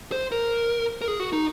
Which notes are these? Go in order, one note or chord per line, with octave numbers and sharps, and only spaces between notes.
C5
A#4
A#4
G#4
F#4
D#4